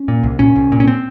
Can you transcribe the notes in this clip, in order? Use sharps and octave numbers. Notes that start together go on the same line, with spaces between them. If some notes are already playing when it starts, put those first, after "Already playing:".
Already playing: C#4
A#2
C2
A#2 C#4
C2
A#2
C#4
C4